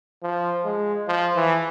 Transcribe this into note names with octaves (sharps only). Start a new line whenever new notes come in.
F3
G#3
F3
E3